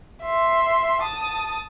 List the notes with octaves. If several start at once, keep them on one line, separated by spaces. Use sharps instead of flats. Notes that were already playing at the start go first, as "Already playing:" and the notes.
E5 C6
A5 D#6